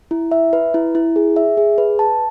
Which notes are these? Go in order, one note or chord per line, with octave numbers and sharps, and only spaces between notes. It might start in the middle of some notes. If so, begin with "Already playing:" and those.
E4
E5
B4
E4
E4
G#4
E5
G#4
B4
A5